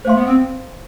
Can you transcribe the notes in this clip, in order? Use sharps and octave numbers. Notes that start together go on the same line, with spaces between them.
A3 C5 F5 C6
B3
C4